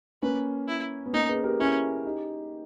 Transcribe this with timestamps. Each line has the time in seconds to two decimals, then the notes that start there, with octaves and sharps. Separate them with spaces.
0.22 A#3 C#4 B4
0.68 E4
1.06 B3
1.13 A#3 C#4 D#4
1.29 G#4 B4
1.44 G4 A#4
1.59 C#4 E4 G#4
2.05 D#4 G4